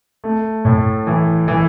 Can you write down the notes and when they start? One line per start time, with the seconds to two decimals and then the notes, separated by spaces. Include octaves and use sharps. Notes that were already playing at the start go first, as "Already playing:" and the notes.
0.24 A3
0.65 A2
1.07 E3
1.48 E3